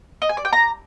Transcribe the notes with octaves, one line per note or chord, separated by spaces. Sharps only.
D#5
G#5
D5
G5
A#5